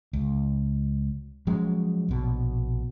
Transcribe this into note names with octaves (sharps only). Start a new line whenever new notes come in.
C#2
F3 F#3 G#3 C#4
A#1 B2